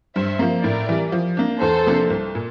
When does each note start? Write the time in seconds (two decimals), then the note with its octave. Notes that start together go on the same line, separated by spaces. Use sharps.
0.15 G2 C5 E5
0.39 F3 A#3
0.64 A2 A#4 D5
0.89 E3 G3
1.12 F3
1.37 A#3 D4
1.61 E2 A4 C5
1.86 C3 F3 A#3 D4
2.10 C2
2.35 A#2